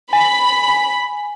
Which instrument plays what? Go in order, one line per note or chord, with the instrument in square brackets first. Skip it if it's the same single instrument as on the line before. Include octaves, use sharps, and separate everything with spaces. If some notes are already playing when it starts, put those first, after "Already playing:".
[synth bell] G#5 [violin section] B5